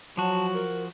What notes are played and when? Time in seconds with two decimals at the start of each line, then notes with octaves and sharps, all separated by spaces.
0.17 F3 F#3 F#4 A5
0.54 A#4